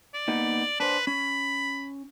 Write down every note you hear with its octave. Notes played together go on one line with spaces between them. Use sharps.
D5
A#3 B3 D#4
D4 B4 C5
C#4 B5